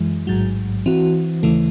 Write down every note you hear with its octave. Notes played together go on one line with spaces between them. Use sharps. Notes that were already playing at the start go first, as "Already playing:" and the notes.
Already playing: F#2 E3 G#3
A1 G#2 F#3
E3 C4 F#4
D#2 C#3 E3 A3